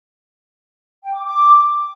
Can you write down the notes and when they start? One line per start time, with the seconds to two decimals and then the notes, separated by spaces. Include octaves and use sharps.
1.03 G5
1.14 D6
1.24 D6